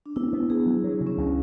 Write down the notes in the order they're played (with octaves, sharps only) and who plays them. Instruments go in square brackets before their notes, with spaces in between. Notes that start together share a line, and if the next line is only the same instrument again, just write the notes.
[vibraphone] D4
[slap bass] B3 [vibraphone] E4
[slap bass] B3
[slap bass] B3 [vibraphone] G#4
[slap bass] F#3
F#3
C#3
[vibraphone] C#4
[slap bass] C#2